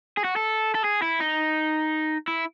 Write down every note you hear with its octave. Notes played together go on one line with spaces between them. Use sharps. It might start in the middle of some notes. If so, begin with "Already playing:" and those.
G#4
F#4
A4
A4
G#4
E4
D#4
E4